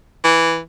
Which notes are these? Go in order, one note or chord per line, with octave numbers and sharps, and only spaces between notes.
E3